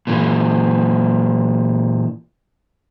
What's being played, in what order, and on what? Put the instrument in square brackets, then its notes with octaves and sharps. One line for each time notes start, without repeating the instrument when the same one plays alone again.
[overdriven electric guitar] A#2 E3